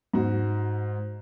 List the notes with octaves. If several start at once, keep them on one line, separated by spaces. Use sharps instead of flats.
G#2 F#4